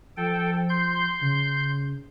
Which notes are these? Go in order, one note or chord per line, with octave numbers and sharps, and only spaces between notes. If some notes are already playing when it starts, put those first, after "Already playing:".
F3 A4 G5
C6 G6
C#3